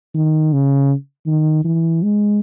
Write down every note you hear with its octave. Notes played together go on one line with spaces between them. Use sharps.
D#3
C#3
D#3
E3
G#3